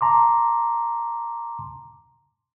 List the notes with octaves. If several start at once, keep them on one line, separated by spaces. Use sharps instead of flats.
A5 A#5 C6 D6